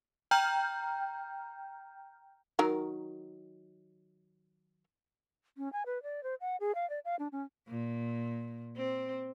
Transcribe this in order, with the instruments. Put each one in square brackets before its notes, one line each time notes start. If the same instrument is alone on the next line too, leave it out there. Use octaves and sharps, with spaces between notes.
[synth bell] G5 A#5 F6 G6
[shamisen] D#3 F#3 A#4
[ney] C#4
G#5
B4
D5
C5
F#5
G#4
F5
D5
F5
D4
C#4
[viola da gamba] A#2
C4